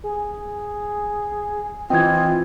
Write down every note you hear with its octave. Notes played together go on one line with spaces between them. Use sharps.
G#4
E3 C4 F4 D#5 G5 G#6